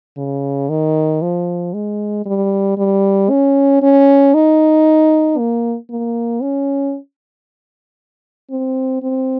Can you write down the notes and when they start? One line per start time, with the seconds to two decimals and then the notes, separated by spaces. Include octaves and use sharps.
0.17 C#3
0.69 D#3
1.22 F3
1.73 G#3
2.26 G3
2.77 G3
3.30 C#4
3.82 C#4
4.34 D#4
5.38 A#3
5.90 A#3
6.42 C#4
8.51 C4
9.03 C4